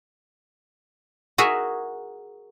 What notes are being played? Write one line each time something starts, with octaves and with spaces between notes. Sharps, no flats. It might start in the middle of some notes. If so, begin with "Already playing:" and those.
F#4 G#4 A#4 E5 F#5